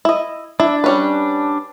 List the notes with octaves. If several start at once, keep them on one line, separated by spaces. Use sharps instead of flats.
E4 D#5
D4 E4
G3 C#4 B4